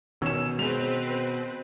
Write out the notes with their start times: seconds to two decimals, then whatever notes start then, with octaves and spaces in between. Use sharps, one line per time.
0.22 B2 D#3 C#4 C#5 E6 E7
0.59 G#3 C4 B4 F7